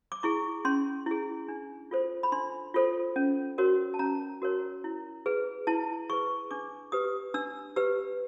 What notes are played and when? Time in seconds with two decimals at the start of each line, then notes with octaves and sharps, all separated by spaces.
0.12 D6
0.23 E4 G#4 C#6
0.65 C#4 C6
1.06 E4 G#4
1.49 D4
1.91 F4 A4 C5
2.23 B5
2.32 D4 C6
2.74 F4 A4 C5
3.16 C#4
3.58 F#4 A#4 C#5
3.94 A5
3.99 C#4 A#5
4.42 F#4 A#4 C#5
4.84 E4
5.26 G#4 B4
5.67 E4 A5
6.10 G#4 B4 C#6
6.51 D4 D6
6.92 G4 B4 D#6
7.34 D4 E6
7.76 G4 B4 E6